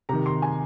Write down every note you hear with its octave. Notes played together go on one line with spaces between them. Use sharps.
C3 D#3 A#5
C6
G#5